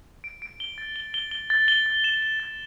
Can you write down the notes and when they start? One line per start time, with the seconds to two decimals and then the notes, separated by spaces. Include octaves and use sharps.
0.24 D7
0.42 D7
0.60 G7
0.78 A6
0.96 G7
1.14 G7
1.31 G7
1.50 A6
1.68 G7
1.86 A6
2.04 E7
2.22 G7
2.40 A6